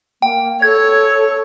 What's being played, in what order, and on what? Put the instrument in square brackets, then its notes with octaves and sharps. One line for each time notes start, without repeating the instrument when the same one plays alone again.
[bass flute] A#3 [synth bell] G5
[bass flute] A4 [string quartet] C#5 [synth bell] G#6